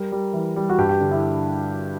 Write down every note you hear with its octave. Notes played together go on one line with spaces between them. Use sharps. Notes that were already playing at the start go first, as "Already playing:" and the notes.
Already playing: G3 A#4
G3
E3
G3
F#4
G2 G4
G4
D3
E4